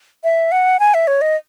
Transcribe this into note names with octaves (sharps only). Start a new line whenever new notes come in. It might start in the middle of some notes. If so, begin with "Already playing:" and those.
E5
F#5
G#5
E5
C#5
D#5